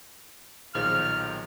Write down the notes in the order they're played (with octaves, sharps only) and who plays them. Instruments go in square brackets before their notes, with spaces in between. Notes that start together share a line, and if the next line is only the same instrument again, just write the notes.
[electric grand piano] B1 A#2 D#3 [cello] F3 [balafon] G#4 C5 [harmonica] F6